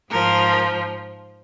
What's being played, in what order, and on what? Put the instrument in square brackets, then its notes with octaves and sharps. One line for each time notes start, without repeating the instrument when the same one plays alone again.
[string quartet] G#2 F3 A#4